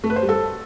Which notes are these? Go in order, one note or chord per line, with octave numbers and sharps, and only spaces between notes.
A3
B4
C5
G3
A4